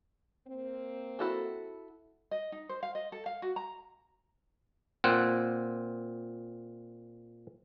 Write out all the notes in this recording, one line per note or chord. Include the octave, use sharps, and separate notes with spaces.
A#3 C4
E4 F#4 A4
D#5
D#4
C5
F5
D#5
A4
F5
F#4
A#5
A#2 C4 F#5